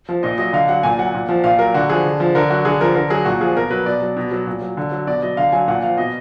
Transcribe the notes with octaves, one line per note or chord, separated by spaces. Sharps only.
F3
A#2 D#5
F#3 D#5
D3 F5
F#3 F#5
A#2 G#5
F#3 F#5
A#2
F3
A#2 F5
F#3 A#4
D3 F#4
F3 G#4
D3
F3
D3 A#4
F#3 F#4
D3 G#4
F3 A#4
D3 A#4
F#3 G#4
A#2 F#4
F3 G#4
B2 A#4
F#3 B4
B2 D5
F#3
B2
F#3
A#2
F#3
D3
F#3
B2 D5
F#3 D#5
D3 F5
F#3 G#5
A#2 F#5
F3 F5
B2 D#5